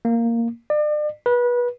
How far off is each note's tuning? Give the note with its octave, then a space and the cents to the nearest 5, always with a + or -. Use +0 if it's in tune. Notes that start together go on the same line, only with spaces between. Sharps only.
A#3 -5
D5 +40
B4 -25